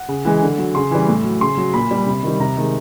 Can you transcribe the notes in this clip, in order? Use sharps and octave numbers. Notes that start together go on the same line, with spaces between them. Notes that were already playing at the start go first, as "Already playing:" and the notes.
Already playing: F#5
C#3
E3 G#3
D3
F#3
C#3 C6
E3 G3
A2
F#3
C#3 C6
F#3
A#2 B5
G3
C3
D#3 G3
C3 A#5
D#3 G#3